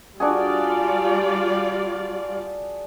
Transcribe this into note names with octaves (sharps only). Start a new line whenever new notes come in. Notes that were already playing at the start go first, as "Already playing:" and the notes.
G3 D4 F4 F#4 G#4 D5